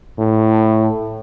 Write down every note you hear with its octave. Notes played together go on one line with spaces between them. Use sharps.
A2